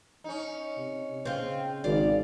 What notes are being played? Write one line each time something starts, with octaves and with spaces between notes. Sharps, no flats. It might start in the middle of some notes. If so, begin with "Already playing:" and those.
C#4 D#4
C3
C#3 C4 F4
G#1 D5 F5